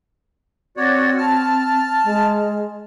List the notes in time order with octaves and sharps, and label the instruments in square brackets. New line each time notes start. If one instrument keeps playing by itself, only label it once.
[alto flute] C4 [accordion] F#4 C#5 D5
[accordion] A5 F6
[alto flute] G#3